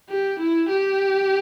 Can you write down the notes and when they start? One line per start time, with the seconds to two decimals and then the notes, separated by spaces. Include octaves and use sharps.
0.09 G4
0.39 E4
0.69 G4